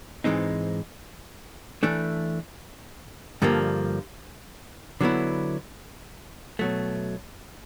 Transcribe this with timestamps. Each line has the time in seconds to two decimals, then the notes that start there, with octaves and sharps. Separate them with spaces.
0.24 G#2 E3 G#3 C4 D#4
1.83 E3 A3 D4
3.42 G2 D3 F3 A#3
5.01 D3 F#3 B3 E4
6.59 B2 F#3 A3